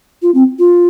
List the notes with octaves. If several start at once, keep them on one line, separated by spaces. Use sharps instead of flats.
F4
C4
F4